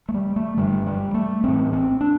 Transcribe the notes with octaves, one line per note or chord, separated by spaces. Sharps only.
A3
G3
A3
G1 G2 D3 G3
G3
A3
A1 A2 C4
C4
D4